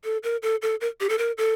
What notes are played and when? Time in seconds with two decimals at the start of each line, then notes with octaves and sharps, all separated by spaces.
0.04 A4
0.23 A#4
0.43 A4
0.62 A4
0.81 A#4
1.00 G4
1.09 A4
1.18 A#4
1.38 A4